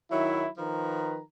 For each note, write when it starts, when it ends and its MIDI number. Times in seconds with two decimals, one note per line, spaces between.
0.10 0.46 51
0.10 0.46 54
0.10 0.46 64
0.58 1.20 51
0.58 1.20 53
0.58 1.20 71
0.58 1.20 82